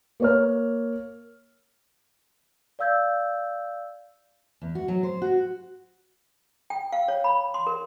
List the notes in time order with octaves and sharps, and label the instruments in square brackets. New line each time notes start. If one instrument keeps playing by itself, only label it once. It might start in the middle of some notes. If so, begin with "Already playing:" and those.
[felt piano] A#3 C#5 F6
[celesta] D5 F5 E6 G6 G#6
[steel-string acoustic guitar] E2
F#4
F#3
C5
F#4
[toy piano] G5
F5
C#5
B5
C6
A#4